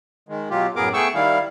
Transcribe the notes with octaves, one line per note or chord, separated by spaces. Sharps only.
D#3 G#3
B2 F#3 F4 G4
F#2 A2 B3 G#4 A#4 D6
A3 B3 G#4 G5 C#6 E6
D#3 G3 E4 F5